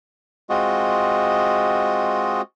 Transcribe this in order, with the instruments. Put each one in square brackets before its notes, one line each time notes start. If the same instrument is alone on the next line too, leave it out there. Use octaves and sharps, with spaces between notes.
[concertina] G#3 C4 F4 F#4 D#5